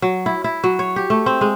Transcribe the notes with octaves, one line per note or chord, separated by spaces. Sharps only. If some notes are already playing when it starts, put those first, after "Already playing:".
F#3
E4
E4
F#3
C#5
G4
A3
C4
G#3